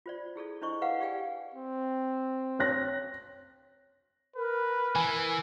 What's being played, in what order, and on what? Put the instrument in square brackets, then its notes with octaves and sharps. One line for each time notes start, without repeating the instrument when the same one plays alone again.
[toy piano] F4 C5 D5
E4 G#4 A4 D5
D4 E4 C5 D#5 C#6
B4 D#5 F5 F#5 D6
G4 D5 F5 G5 G#5
[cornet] C4
[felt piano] C#5 F#6 A#6
[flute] A#4 [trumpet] B4
[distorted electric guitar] E3 [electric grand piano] G#5